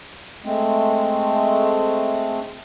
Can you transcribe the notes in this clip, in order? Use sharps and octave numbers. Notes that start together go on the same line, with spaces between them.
G#3 A3 C4